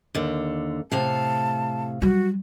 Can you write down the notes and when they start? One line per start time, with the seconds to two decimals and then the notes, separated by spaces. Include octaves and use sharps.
0.15 D#2 D3
0.92 A2 C3 F5 A5
2.02 F#3 G3 F#4